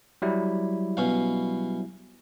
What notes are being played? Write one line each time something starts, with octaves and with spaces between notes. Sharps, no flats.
F#3 G3 E4
B2 C#4 F5